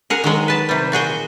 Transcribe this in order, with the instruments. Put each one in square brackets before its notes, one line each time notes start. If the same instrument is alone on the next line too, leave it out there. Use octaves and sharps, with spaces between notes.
[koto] G#4 A#4 F#5
D#3 F#3 G#3
B4 A5
C3 G3
A#2 F#4 G#4 G5